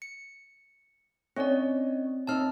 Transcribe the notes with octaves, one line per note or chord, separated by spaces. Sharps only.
C#7
C4 C#4 D#4 C#5 D5
D#2 C4 D#4 A5 F6